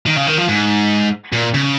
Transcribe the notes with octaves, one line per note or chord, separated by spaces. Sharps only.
D#3
C#3
D#3
F3
G#2
A#2
C#3